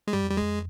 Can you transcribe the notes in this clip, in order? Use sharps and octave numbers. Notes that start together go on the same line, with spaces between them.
G#3
G2 G3
F2
E2 G3
F2 G#3